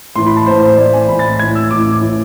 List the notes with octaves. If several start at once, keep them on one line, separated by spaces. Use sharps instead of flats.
A2 E3 C6
B5
A5
A2 E3 C5
C5
A2 E3 D5
G#5
A2 E3 B5
A6
A2 E3 G#6
E6
A2 E3 D6
A2 E3